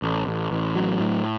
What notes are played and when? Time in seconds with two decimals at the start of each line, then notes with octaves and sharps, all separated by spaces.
0.02 A1
0.27 A1
0.51 A1
0.75 F#3
0.99 A2